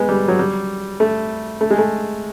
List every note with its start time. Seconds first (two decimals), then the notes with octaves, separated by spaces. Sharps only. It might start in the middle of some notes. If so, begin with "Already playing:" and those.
Already playing: G#3 B3
0.09 G3
0.28 F#3
0.39 G3
1.00 A3
1.61 A3
1.70 G#3
1.78 A3